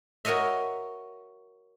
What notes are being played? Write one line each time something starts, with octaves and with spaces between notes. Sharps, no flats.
F#4 A#4 C#5 D#5 E5